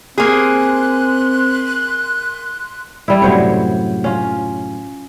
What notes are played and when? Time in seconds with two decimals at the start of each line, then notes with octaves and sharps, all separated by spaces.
0.18 A#3 C4 G#4 C6 F#6
3.08 G3 E4
3.22 F#2 A2 C3 F#3 C5 C#5
4.04 C#4 F4